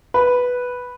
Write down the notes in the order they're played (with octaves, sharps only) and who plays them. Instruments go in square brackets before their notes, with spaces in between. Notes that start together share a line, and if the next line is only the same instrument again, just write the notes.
[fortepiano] B4